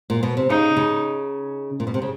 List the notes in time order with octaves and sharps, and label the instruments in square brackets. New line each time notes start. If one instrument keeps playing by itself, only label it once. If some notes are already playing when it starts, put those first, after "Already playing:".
[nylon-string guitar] A#2
B2
C3
[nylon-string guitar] C#3 [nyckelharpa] D#4
[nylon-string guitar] C#3
A#2
B2
C3
C#3